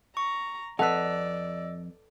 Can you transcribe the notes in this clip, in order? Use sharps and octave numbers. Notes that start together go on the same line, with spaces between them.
A#5 C#6
F2 A4 B4 D5 D#5 F#5 E6